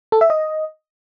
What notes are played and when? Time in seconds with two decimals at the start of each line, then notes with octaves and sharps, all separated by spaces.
0.12 A4
0.21 E5
0.30 D#5